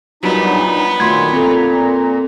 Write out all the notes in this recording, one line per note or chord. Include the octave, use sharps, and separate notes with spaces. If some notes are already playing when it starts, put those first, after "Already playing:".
A#2 F#3 G3 B3 D4 D#4
A#2 D#3 F#3 A3 C6 G#6
C4 A4 A#5